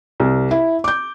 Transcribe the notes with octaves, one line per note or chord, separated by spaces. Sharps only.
C2
E4
D6 G6